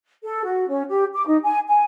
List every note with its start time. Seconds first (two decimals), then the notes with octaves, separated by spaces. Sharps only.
0.23 A4
0.43 F#4
0.67 C#4
0.89 G4
1.13 D6
1.26 D#4
1.42 G#5
1.68 G#5